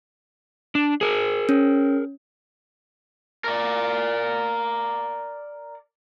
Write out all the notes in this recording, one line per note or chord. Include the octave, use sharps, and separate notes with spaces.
D4
G#4 A#4
C#4
A#4 D5